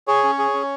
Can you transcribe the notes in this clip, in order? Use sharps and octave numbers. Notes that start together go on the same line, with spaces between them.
G#4 C#5
C#4
G#4
C#4